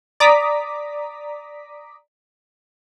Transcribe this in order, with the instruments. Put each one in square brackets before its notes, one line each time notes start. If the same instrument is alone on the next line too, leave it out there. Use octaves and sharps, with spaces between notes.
[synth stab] D5 A#5 D6 D#6 B6